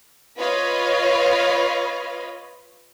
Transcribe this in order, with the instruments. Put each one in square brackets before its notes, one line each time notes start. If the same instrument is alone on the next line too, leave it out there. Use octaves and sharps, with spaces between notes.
[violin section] F4 B4 C#5 D#5 F5 B5